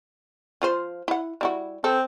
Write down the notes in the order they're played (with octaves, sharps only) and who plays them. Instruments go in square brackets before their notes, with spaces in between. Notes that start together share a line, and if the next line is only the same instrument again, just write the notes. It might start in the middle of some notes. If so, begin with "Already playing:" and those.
[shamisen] F3 F4 C5
E4 F#5
G3 E4 F#4
[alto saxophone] C4 [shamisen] A4